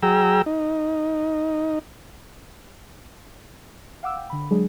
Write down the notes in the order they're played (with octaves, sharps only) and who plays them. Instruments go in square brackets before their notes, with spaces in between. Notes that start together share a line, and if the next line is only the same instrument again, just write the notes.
[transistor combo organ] F#3 G#4 G5 A#5 E6
D#4
[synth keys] F5 F#5 D6 E6
G5
D3 B5
F#3 G#3 D4 G#4